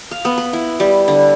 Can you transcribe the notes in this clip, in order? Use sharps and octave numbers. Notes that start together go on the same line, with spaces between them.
F5
B3
B4
E4
G3
D3